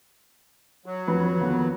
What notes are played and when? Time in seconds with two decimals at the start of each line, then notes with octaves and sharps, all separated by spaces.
0.86 F#3
1.07 F2 B4
1.40 D#2 D3 B3